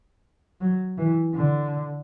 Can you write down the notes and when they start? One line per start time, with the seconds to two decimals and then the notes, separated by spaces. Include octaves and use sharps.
0.61 F#3
0.98 E3
1.35 D3